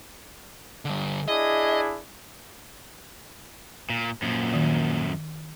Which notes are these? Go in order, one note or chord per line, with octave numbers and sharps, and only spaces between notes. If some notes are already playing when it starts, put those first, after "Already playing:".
D3 G3
D4 E4 G#4 D#5
A#2
F#2 A#2 F3
D#3